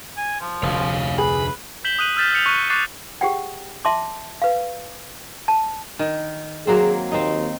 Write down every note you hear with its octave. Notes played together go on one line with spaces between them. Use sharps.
G#5
F3
F1 D2 C#5 F5
G#4 B4 B5
G6 B6 E7 F#7 G7
D#6 F#6 D#7 F#7
E6 F6 G6 A6 B6 E7
D#6 E6 G6 C#7 F7
C#6 F#6 C#7 D#7 F#7
C#6 D6 F#6 A6 C7
G4 G#4 F#5 G5
E5 A5 C6 D6
B4 F5
A5
D#3
F#3 A#3 C4 G#4
D#2 C4 D#4